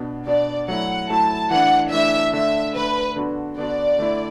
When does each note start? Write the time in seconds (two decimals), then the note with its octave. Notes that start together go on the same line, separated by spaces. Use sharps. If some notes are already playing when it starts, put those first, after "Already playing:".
Already playing: B2 B3 D4
0.26 B2 B3 D4 D5
0.68 F#3 A3 E4 F#5
1.09 F#3 A3 E4 A5
1.51 E3 A3 D4 F#5
1.92 E3 A3 D4 E5
2.33 D3 A3 D4 E5
2.75 D3 A3 D4 B4
3.16 D3 B3 D4 F#4
3.58 D3 B3 D4 F#4 D5
3.98 D3 A3 E4